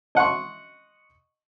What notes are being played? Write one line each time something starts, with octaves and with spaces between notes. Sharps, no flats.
D#5 F#5 C6 C#6